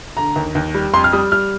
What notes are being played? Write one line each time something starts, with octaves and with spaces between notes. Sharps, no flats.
D3 A#5
D#2
D#2
G3
F2 C6
F6
G3 D#6
G3 F6